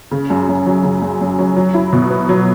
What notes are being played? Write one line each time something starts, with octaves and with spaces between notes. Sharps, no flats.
C#3
F#2
F#2
F#3
C#3
F#2
F#2
F#3
F#3
E4
B2
B3
F#3